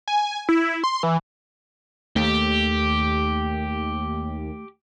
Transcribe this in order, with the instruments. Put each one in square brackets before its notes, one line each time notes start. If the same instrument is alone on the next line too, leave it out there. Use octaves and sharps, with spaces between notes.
[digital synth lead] G#5
E4
C6
E3
[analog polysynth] D#2 [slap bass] A3 [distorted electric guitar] G4